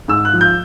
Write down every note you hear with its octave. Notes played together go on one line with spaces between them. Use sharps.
G#2 E6
F#6
F3
G6